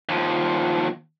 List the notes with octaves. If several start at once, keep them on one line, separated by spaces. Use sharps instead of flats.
D#2 F3